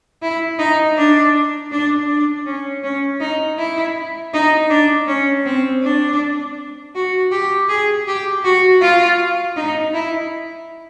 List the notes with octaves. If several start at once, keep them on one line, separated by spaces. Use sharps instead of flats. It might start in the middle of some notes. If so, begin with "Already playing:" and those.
E4
D#4
D4
D4
D4
C#4
C#4
D#4
E4
D#4
D4
C#4
C4
D4
F#4
G4
G#4
G4
F#4
F4
D#4
E4